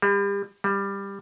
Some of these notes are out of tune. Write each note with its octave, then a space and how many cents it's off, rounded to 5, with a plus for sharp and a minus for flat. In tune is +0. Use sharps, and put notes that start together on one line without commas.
G3 +35
G3 +15